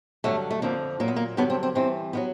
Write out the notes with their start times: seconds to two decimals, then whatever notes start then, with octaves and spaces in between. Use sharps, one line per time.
0.24 G2 D3 F#3 A3
0.51 A3
0.62 F2 D3 F3 A#3
1.00 A#2 F#3 A#3
1.08 B3
1.16 A#3
1.37 G2 D3 F#3 B3
1.50 C4
1.63 C4
1.75 G2 E3 C4
2.13 D#3 F#3 B3